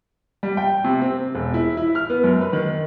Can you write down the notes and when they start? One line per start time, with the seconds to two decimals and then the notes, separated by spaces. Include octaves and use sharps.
0.43 G3
0.57 G5
0.84 C3
1.02 C4
1.35 E1
1.54 E4
1.77 E4
1.95 F6
2.10 B3
2.24 F#2
2.41 B4
2.53 D#3